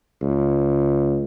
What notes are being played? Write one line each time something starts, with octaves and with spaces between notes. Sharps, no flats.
C#2